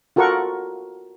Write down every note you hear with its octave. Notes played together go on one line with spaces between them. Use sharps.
F4 F#4 A4 A#4 F#5 C#6